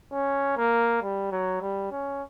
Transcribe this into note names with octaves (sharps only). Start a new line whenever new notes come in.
C#4
A#3
G3
F#3
G3
C#4